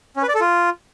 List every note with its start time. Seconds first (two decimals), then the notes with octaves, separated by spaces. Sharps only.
0.17 C#4
0.23 B4
0.29 D5
0.35 A4
0.41 F4